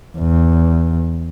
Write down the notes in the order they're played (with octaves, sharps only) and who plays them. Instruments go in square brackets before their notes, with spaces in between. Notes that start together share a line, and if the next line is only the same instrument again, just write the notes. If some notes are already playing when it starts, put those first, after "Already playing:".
[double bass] E2